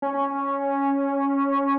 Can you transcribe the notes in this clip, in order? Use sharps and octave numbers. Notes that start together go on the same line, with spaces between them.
C#4